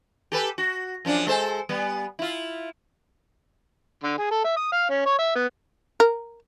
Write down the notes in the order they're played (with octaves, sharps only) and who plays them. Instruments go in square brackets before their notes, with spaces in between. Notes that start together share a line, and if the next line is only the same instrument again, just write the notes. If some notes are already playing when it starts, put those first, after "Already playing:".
[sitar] G4 A4 B4
F#4
F#2 F3 D4
G#3 A4 C5
G3 B3
E4 F4
[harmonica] D3
G#4
A4
E5
D#6
F5
C#4
C#5
E5
B3
[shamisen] A#4